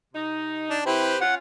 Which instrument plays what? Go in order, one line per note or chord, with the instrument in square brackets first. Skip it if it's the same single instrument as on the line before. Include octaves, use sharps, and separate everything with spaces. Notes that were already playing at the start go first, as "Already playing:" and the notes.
[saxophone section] C3 D#4
[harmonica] D4
[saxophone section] C3 E4 [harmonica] C4 G4 B4
[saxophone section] C#4 F4 [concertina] F#5